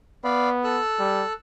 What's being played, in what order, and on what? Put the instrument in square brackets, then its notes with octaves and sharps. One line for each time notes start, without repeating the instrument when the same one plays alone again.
[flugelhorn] B3 [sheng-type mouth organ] D5 F5 B5
[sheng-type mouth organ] A4 E6 F#6
[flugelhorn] G3